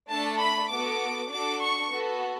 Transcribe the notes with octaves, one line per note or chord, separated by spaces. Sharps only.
A3 D4 A4 A5
B5
B3 F#4 A4 D6
D4 F#4 A4 D6
C#6
B3 F#4 A4